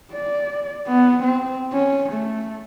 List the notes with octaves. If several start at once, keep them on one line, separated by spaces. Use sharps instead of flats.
D5
B3
C4
C#4
A3